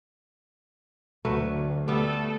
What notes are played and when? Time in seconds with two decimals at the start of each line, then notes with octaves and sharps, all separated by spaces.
1.25 D2 F#3 A3 B4
1.88 G3 A3 B3 A4